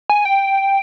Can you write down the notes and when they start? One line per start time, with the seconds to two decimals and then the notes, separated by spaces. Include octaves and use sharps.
0.10 G#5
0.25 G5